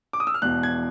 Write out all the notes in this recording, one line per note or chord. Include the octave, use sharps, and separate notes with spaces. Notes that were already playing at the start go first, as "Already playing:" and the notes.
D6
D#6
E6
F6
E1 E2 B2 F#6
G#6